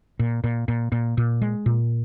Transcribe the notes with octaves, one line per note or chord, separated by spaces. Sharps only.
A#2
A#2
A#2
A#2
A#2
G#3
A#2